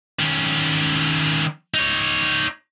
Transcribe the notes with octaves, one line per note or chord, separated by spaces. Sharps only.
D#3 C#4
D#4 C#5